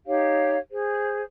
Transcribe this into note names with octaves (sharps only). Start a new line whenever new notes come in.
D#4 G4 C#5 F5
G#4 C5